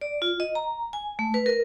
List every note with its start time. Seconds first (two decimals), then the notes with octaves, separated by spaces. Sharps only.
0.01 D5
0.22 F4
0.40 D#5
0.55 A#5
0.93 G#5
1.19 A3
1.34 B4
1.46 A#4